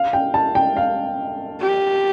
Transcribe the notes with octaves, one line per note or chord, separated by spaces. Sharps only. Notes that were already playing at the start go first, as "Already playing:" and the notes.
Already playing: F5
G5
A5
G5
F5
G4